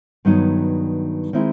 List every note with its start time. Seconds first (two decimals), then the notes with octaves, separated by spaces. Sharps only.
0.25 G2 D#3 F#3 B3 D#4
1.33 D#3 G#3 C4 E4